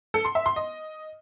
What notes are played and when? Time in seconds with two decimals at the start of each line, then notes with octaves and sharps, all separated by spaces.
0.14 A4
0.25 C6
0.35 E5
0.46 C6
0.56 D#5